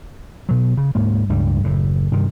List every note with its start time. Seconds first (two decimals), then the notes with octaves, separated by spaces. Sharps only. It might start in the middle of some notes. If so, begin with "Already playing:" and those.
0.49 B2 F#3
0.77 C#3
0.95 D2 G#2 A#3
1.29 C#2 G2 G3
1.64 F#1 A2
2.12 G2 C3 D#3